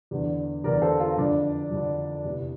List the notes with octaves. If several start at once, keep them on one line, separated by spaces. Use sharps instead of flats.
E2 D3
E2 D3 A#4 D5
A4 C5
F4 A4
F2 D3 D4
F2 D3
E2 C3 E3